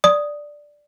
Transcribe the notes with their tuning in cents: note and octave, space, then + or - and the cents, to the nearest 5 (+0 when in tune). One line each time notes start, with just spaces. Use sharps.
D5 +0 D#6 +0